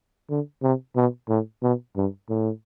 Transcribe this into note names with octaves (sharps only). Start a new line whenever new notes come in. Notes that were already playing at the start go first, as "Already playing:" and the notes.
D3
C3
B2
A2
B2
G2
A2